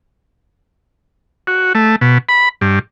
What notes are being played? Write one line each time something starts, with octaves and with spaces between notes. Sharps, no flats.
F#4
A3
B2
B5
G2